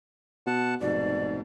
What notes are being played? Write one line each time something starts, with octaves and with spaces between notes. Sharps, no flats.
B2 F#5 A5
F1 G#2 B2 D5